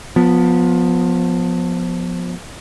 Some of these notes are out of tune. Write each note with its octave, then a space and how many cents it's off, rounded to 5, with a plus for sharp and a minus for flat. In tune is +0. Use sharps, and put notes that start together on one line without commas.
F3 +20 B3 +0